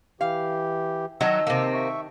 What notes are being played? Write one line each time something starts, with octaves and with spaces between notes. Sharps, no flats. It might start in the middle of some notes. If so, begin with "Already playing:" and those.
E3 G4 F5
D#3 F#3 D#5 A5 E6
C3 A#3
E5 C#6